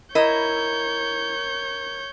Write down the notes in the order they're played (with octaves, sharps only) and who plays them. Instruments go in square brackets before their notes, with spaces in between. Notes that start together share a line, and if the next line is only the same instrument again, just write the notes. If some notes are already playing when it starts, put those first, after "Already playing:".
[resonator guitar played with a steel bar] E4 D#5 [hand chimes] A#4 A#5 [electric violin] C#5 G6